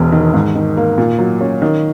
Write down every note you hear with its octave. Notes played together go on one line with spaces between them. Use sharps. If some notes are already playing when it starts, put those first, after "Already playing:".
Already playing: E1 E2
D#3
G#2
D#3
A#3
A#2
F#3
C#4
D#3